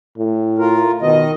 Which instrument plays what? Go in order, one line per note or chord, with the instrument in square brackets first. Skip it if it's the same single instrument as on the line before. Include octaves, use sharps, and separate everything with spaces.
[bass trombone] A2
[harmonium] F4 A#4
[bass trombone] B2 [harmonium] D#3 D#5